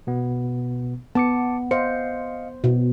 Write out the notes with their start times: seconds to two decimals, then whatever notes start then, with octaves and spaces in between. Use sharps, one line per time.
0.07 B2 B3
1.15 B3 A5 D6 C#7
1.71 C5 D#5 F5 C#7
2.64 B2